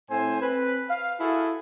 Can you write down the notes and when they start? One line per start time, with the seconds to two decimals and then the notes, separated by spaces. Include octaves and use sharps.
0.10 A2 C4 C5 G#5
0.41 C4 B4
0.90 F5
1.20 E4 F#4 G#4 A4